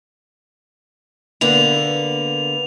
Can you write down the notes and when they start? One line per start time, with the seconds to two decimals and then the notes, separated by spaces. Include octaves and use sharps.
1.41 D3 A#3 B3 F7